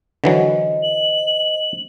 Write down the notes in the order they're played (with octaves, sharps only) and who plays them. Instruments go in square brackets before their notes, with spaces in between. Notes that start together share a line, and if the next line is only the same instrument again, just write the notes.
[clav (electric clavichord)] D3 E3 F#3 [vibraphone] C5 D#5
[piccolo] F#7